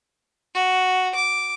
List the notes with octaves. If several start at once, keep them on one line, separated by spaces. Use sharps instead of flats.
F#4
D6